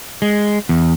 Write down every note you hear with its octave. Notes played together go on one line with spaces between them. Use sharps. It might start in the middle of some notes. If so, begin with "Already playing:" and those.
G#3
E2